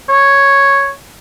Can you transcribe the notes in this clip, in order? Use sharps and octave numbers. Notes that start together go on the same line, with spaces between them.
C#5